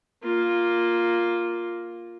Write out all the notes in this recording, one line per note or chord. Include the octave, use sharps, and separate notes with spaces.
A#3 F4